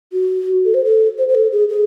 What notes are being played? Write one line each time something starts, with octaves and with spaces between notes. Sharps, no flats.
F#4
A4
C5
A4
C5
C5
A4
G#4
G#4